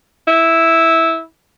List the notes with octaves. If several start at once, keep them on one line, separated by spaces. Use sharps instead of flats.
E4